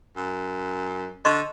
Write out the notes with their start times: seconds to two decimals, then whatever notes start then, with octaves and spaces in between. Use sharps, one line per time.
0.16 F#2
1.25 D3 D#5 C6 C#6